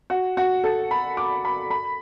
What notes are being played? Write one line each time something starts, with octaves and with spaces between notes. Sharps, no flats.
F#4
F#4
A4
B5
D6
B5
B5